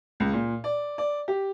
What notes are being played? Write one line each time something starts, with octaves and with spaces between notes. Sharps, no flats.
C#2
A#2
D5
D5
G4